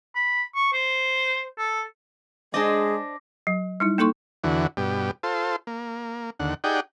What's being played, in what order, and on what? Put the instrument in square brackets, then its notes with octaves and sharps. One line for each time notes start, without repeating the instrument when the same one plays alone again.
[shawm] B5
C#6
C5
A4
[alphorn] G#3 [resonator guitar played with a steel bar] D4 C5 D#5 [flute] G#4 [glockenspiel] D6 A#6
[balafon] F#3
G3 D#4 E4
A#3 D#4 A4 C6 C#6
[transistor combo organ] E2 D3 E3 F#4
G2 B2 G4
F4 A4 C5
A#3
D#2 D3 F#5
D#4 G4 G#4 D5 F#5 G5